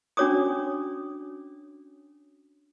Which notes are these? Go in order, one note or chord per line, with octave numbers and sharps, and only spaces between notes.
C#4 D4 F#4 C#5 D6 D#6